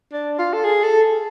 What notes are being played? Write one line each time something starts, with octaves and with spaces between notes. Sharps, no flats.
D4
F4
A4
G#4
A4